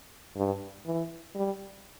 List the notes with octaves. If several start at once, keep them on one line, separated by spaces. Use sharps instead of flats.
G2
E3
G3